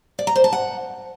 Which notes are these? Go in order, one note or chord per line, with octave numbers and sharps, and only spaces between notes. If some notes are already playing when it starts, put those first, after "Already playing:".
D5
A#5
C5
A5
F#5